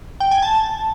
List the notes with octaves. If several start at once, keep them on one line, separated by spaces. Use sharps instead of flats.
G5
G#5
A5